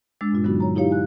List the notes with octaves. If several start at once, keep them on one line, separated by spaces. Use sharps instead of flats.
G#3 D4 D6 E6 A6
G2 A#2 F4
D3 F#3 B3 D#4 F#4
C#5 A#5
D#4 E4 G4 C#5 F5
G#5 F#6